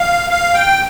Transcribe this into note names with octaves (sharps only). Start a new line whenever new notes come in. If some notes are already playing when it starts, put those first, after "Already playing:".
Already playing: F5
F5
G5